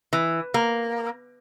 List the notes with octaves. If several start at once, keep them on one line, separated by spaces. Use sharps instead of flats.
E3
A#3